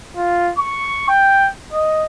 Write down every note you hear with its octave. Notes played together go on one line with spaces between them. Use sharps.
F4
C#6
G5
D#5